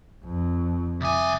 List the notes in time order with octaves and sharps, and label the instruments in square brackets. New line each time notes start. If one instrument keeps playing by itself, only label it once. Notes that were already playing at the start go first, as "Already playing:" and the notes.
[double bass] F2
[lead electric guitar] C2 G#5 [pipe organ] E5 D6 D#6